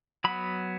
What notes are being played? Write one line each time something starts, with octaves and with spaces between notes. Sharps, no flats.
F#3 B3 B5